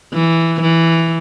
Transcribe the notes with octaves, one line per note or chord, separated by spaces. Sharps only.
E3
E3